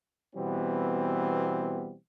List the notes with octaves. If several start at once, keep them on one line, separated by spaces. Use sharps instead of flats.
B2 E3 G3 B3 C4